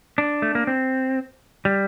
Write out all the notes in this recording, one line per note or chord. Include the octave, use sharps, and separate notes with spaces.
D4
A3
A#3
C4
G3